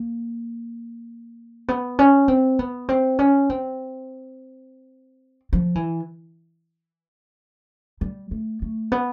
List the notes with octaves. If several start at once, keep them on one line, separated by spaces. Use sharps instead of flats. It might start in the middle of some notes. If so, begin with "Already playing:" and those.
Already playing: A#3
B3
C#4
C4
B3
C4
C#4
C4
F3
E3
G3
A3
A3
B3